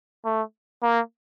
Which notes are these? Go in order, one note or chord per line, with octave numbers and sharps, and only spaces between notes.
A3
A#3